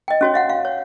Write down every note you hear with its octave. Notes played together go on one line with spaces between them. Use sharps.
D#5 G5
C#4 F#4 C#5
D#5 F5 F#5
F5
C#5